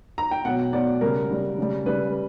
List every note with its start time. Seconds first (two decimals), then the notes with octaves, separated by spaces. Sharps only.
0.18 A#5
0.31 G5
0.45 B2 F#3 F#5
0.73 B2 F#3 D5
1.01 C#3 G3 A#4
1.30 C#3 G3
1.58 C#3 G3
1.86 C#3 G3 B4